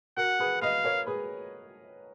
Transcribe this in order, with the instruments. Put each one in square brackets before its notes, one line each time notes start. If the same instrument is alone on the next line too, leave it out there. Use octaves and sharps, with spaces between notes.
[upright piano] F#4 A#4 [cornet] F#5
[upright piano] G#4 B4
[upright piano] B4 D#5 [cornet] F5
[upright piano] A#4 C#5
G#4 B4